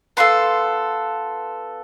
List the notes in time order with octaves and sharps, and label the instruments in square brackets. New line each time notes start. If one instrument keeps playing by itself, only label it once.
[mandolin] B3 F4 A4 C6